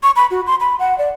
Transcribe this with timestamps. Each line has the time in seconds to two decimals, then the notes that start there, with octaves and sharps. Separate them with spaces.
0.03 C#6
0.16 B5
0.31 F#4
0.47 C6
0.60 B5
0.79 F#5
0.98 D5